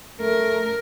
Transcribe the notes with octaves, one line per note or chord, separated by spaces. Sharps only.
A3 A#4